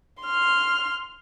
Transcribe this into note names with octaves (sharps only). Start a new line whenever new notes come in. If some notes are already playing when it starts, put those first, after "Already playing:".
C6 F6